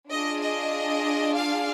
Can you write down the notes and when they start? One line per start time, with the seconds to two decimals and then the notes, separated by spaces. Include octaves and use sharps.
0.10 D4 F4 G#4 D#5
0.41 D#5
1.35 F5